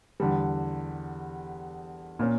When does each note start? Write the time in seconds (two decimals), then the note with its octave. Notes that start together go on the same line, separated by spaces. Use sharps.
0.20 E2 D3 G3
2.19 A#2 A#3 C#4